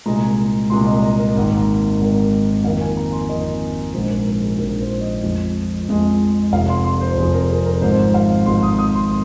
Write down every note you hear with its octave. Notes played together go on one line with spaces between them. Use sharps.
C2 A#2 G#3 A#5
C2 A#2 G#3 C6
D#5
D#5
A#4
G#1 G#2 D#3 A#3
G#1 G#2 D#3 A#3
F2 D#3 A#3 F5
G#5
A#5
C6
F2 D#3 A#3 D#5
A#1 G#2 F3 C5
A#4
A#4
A#4
G#4
A#1 G#2 F3 A#4
C5
D#5
F2 F3 G#3
F2 F3 G#3
F1 F2 F3 F5
C6
C6
C5
F1 F2 F3 G#4
A#4
G#4
A#4
G#1 G#2 F3 C5
F5
G#1 G#2 F3 C6
D#6
D#6
C6